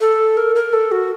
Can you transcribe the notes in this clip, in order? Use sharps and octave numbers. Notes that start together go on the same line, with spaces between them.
A4
A#4
A#4
A4
F#4